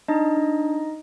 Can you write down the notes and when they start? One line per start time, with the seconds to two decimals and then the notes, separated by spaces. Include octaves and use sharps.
0.08 D4 D#4 D#5
0.37 D4